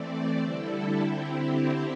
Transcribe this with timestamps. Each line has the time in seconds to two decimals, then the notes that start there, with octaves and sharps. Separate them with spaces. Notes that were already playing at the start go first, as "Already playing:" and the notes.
Already playing: E3 A3 C4 D5
0.40 D3 G3 E4 A4
1.04 D3 C4 E4 G4